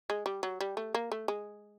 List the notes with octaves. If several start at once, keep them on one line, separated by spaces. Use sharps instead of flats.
G#3
G3
F#3
G3
A3
A#3
A3
G#3